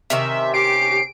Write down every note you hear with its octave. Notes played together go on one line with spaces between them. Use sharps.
C3 D#3 C#4 E5
G4 C7 D7